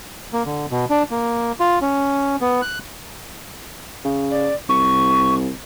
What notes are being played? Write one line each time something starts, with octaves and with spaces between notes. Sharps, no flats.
A#3
D3
B2
D4
A#3
F4
C#4
B3
F#6
C#3
D5
C2 C#6